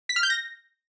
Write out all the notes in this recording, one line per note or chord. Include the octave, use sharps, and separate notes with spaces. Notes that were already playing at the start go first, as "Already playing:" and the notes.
B6
F6
G6
A#6